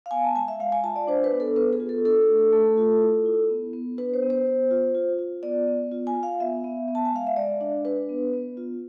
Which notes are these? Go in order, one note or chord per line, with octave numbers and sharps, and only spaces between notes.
F5
B3 G#5
A5
G#3 G#5
E5
G#3 F5
G#5
F4 A5
D5
D4 C5
B4
B3
A4
B3 B4
G#4
F4
A4
D4 A4
A3
A3
F4
E4
E4
B3
B3
D4 B4
C5
B3
C5
B3
F4
F4
F4
B3 D5
B3
F4
G#5
F4
F5
B3 E5
B3
B3
A5
G#5
G#3 F5
E5
G#3 D5
D4
D4 B4
B3
B3
F4